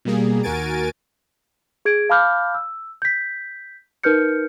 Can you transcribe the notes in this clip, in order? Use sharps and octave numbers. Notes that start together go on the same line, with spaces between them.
B2 G3 A#3 G#4
D#2 F#4 A#4 G#5 A6 D7
G#4 G#6 D7
F5 A5 B5 D6 F6 G6
E6
G6 B6
D#4 A#4 B4 F6 G6 C#7